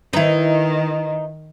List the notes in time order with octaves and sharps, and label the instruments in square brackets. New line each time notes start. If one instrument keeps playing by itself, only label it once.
[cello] D#3 [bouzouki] D#4 [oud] E4 B4